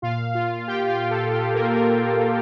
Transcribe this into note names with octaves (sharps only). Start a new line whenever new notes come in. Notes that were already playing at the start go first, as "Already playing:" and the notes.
A#2 F4 F5
F4 F5
G4 G5
G5
F4 F5
A4
G4
A#3 A#4
A#3 A#4